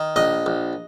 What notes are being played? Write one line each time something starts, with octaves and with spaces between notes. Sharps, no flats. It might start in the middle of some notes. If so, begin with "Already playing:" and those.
Already playing: D#3
A#1 D#5
A#1